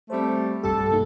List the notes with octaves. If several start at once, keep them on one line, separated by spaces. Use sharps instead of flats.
G3 A3 C4 C5
B1 G2 G4 A4
B2 A#3 D#4